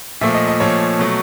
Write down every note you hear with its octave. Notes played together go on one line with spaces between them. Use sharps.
A#2 F3 A3 E5
D#5
D#5
A#2 F3 A3 C#5
B2 F#3 A3